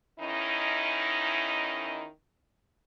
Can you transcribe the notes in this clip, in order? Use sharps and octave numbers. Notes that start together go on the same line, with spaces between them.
E2 D#3 C#4 D#4 E4 D#5